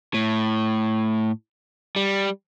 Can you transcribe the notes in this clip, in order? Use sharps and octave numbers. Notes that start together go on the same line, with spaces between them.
A2
G3